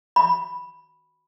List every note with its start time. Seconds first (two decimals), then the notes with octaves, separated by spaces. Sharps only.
0.16 B5